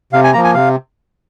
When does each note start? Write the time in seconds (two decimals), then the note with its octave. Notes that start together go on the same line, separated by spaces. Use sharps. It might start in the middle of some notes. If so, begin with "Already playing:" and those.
0.13 C3 F5
0.24 G#5
0.33 F3 A#3 A#5
0.44 G#5
0.54 C3 F5